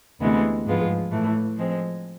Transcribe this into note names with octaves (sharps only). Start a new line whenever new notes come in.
D2 C3 E3 G#3 B3
G#2 F3 G#3 B3 F4
A2 E3 A3
F3 G#3 C4